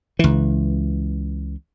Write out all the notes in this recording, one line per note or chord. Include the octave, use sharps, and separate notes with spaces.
C#2 E3